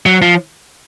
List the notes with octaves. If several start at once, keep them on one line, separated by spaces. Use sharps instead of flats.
F#3
F3